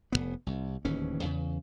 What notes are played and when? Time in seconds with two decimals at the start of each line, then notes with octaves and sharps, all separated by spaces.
0.12 F1 F#2 B3
0.46 C2
0.85 D1 D#2 E3 C#4
1.23 E2 C#3